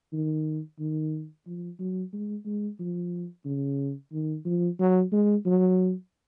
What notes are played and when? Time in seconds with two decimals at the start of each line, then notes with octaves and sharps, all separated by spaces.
0.13 D#3
0.79 D#3
1.46 F3
1.79 F#3
2.13 G#3
2.45 G#3
2.79 F3
3.45 C#3
4.12 D#3
4.45 F3
4.79 F#3
5.12 G#3
5.46 F#3